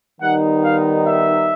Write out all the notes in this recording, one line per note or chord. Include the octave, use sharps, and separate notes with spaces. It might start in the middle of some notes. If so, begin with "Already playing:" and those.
D#3 G3 B3 D#4 F#5
F5
E5